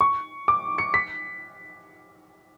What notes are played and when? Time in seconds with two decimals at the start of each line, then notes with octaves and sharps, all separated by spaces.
0.01 C#6
0.48 D6
0.78 C#7
0.94 B6